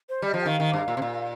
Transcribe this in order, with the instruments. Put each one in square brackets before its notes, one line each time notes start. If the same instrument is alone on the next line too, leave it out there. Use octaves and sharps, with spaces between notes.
[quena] C5
[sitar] G3
[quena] D#5
[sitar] F3
[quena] G5
[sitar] D#3 [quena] F5
[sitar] D#3
G2
A#2
C3
A#2